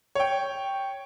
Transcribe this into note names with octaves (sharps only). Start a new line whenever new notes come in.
C#5 G5